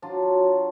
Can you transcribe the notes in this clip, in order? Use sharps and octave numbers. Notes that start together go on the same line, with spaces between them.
F#3 D4 F4
F#3
F#3